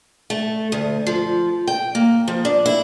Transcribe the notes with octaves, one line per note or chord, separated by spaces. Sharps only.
A3
D2
F3
G5
A#3
F3
D4
E4